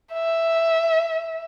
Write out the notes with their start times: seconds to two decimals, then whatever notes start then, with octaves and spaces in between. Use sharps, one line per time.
0.13 E5